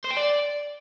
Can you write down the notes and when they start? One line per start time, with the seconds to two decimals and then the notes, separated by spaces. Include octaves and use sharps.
0.05 C5
0.11 G5
0.17 D5